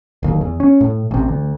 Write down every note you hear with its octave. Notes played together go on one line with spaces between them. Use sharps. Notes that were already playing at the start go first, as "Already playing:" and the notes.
D1 D#2
E2
C#4
A2
A1 C3
D2